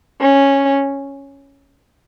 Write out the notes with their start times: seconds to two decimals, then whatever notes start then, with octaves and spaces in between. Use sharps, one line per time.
0.21 C#4